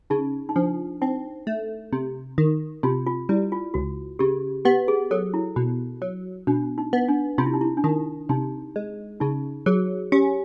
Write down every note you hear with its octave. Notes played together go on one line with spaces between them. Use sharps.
C#3 D#4
D#4
F3 D4
C4 D#4
A3
C3
D#3
C3 F4
F4
G3 E4
F4
C#2 F#4
C#3 G4
B3 G4
G#4
F#3 A4
E4
B2
F#3
B2 D4
D#4
B3
D4
C3 F4
E4
D#4
E4
D4
D#3 D#4
C3 D#4
G#3
C#3 D#4
F#3 G#4
C#4 G4